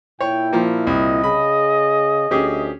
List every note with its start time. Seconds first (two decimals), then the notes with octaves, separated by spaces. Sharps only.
0.21 A#2 E4 C#5 G5
0.53 F3 A#3
0.87 C2 D#5
1.24 C#3 G#4 B5
2.31 D2 C#4 G4 G#4